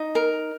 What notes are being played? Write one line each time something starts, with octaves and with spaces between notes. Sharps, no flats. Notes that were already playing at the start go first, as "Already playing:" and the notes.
Already playing: D#4
A#4